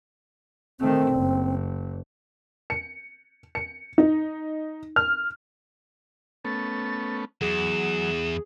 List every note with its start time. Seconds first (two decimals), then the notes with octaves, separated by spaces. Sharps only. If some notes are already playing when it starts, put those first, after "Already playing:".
0.79 D#3 A3 C4
1.11 F#1
2.70 C#7
3.55 C#7
3.98 D#4
4.96 F6
6.45 A3 B3 C#4 A6
7.41 E2 F#3 G#4 E7